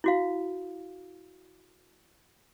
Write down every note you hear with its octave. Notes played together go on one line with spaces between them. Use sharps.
E4 F#4 F5